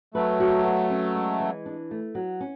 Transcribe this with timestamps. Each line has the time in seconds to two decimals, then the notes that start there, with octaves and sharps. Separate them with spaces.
0.14 F#3 A3 B4
0.40 F#4
0.65 B3
0.89 C#4
1.15 G#3
1.40 E3
1.66 D4
1.91 A3
2.15 F#3
2.40 C#4